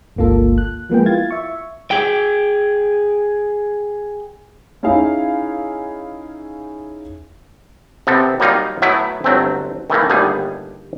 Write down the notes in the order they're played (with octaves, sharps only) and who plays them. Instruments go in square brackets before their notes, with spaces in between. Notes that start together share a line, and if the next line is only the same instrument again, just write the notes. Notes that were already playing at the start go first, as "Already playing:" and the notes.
[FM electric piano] G1 C#2 A#3 F4 A4
F#6
F3 G#3 A#3 B3 G#4 G5
E4 F4 F5 G#6 A6
E5 C#6
[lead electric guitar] G#4 G5
[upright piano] C#4 D#4 E4 G#4 F5
[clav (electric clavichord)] C3 B3 C4 A4
F#3 G3 A#3 D#4 F4
F#3 A3 B3 E4 B4
G1 F#3 A3 C4
D#3 E3 A3 A#3
G1 D#2 G3 A3 B3 G#4